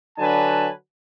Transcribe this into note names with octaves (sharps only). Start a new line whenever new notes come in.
D3 F#3 D4 B4 G#5 A5